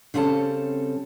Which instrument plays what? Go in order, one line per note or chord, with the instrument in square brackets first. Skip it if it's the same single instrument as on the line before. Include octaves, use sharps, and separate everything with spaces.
[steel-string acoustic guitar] C#3 G3 C4 C#4 A4 A5